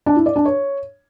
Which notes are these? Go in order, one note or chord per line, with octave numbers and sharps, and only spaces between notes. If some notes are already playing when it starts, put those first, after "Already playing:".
D4
E4
D5
D4
C#5